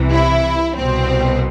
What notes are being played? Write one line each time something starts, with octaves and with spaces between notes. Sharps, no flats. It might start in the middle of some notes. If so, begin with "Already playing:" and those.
Already playing: C2 C3 E3
E4
C2 B2 C4